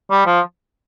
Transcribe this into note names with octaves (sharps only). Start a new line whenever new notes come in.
G3
F3